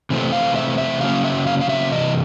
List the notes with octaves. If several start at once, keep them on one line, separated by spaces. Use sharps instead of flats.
C3 E3 A3 C4
F5
E5
E5
C#3 F#3 A#3 C#4 F5
E5
F5
F5
E5
C3 E3 D#5